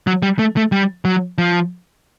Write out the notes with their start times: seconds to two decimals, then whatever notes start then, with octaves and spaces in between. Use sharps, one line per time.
0.07 F#3
0.22 G3
0.39 A3
0.57 A3
0.72 G3
1.05 F#3
1.38 F3